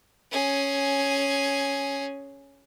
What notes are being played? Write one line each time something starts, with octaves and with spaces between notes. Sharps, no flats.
C#4 G#4